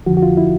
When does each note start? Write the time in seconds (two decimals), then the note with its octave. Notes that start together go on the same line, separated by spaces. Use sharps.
0.06 F2 D3 F3 F#4
0.17 F#4
0.23 F4
0.37 E4